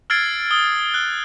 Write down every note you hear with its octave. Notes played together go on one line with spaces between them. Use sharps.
E6 F6 G#6 A6 C7 D7
D#6 G7
F#6